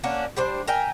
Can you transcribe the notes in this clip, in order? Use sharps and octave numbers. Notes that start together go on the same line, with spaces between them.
A#3 C#4 D4 F#4
G3 D4 C5
A#4 E5 G5 G#5